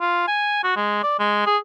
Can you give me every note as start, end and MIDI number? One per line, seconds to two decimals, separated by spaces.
0.01 0.24 65
0.28 0.59 80
0.64 0.75 66
0.76 0.98 56
1.03 1.16 74
1.19 1.42 56
1.46 1.57 68